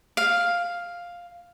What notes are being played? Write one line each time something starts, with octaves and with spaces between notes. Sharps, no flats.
F5